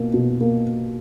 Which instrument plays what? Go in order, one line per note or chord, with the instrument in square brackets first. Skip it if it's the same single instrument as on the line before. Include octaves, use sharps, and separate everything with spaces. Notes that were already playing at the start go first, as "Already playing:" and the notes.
Already playing: [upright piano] B2 A#3
B2
A#3